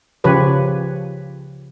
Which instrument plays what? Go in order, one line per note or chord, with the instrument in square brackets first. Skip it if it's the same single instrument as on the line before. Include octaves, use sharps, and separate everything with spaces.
[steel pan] C#3 F3 G4 B4 C#5